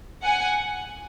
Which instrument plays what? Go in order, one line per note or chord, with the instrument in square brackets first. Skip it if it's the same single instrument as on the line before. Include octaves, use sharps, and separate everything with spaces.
[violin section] F#5 G#5